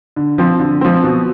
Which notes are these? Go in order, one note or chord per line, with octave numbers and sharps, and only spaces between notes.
D3
F3 C4
D3
F3 C4
B2